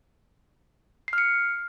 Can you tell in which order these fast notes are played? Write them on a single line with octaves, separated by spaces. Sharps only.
C7 F6 C#7